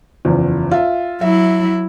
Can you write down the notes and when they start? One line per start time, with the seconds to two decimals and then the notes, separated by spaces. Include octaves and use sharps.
0.25 F#1 E2 F3
0.71 F4 E5
1.21 F#3 E4 E5